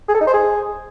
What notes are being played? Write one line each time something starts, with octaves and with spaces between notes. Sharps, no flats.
G#4
A4
D#4
C5
G#4